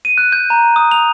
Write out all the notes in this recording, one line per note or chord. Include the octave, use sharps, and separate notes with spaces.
D#7
F#6
G6
A#5
D#6
F7